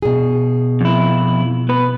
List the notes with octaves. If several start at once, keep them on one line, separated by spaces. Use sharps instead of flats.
B2 G#4
F2 E4
B3 B4